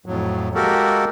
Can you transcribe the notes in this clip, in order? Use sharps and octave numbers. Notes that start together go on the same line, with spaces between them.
F2 A2 F#3
G#3 A#3 F#4 G4 A4 A#4